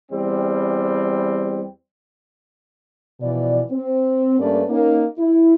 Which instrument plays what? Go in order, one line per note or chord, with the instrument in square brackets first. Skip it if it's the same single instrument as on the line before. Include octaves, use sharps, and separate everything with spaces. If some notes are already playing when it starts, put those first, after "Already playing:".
[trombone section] E2 G3 C4
[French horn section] B2 E3 F3 D5
C4
G2 A3 A#3 C#4 B4 D5
A#3 C#4 D#4
E4